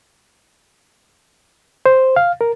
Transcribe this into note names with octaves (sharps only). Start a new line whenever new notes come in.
C5
F5
A#4